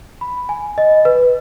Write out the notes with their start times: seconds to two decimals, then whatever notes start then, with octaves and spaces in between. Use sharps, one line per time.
0.21 B5
0.49 G#5
0.78 D#5
1.05 B4